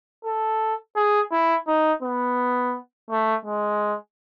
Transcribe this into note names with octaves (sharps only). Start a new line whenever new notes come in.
A4
G#4
E4
D#4
B3
A3
G#3